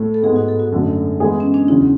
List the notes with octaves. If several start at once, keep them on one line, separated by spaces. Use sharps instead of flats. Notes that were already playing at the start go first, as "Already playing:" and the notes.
Already playing: A2 A3
A4
G#2 G#3 B3 G#4
F#4
A4
F#4
F#2 D3 F#3 A3
E3 G#3 B3 E4 G#4
C#4
D4
E2 C#3 F#3 C#4 E4